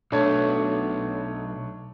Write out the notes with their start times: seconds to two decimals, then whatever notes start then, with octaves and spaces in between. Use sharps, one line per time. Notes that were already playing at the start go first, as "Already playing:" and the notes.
0.12 B1 A3 D4 C#5